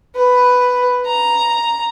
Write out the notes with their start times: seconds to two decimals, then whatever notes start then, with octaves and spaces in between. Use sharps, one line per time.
0.16 B4
1.06 A#5